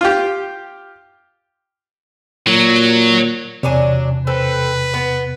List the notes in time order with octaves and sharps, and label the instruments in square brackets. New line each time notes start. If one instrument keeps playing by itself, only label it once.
[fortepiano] F4 G4
[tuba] A#2 [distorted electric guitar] F#3
[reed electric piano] E2 C3 [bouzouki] F#3 D4 G#5
[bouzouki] C4 A4 [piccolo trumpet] B4
[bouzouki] B3